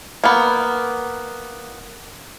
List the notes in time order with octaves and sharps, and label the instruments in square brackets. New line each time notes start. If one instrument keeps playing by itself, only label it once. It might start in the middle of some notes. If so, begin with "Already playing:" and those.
[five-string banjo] A#3 B3